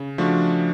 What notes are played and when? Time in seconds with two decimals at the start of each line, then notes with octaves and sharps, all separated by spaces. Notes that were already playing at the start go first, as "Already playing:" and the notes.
Already playing: C#3
0.18 F3 A3 D4 F#4